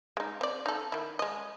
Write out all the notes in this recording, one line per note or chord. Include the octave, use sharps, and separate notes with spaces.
G#3 D#4
C4 D5
D#4 A4
D#3 E4
G#3 D#5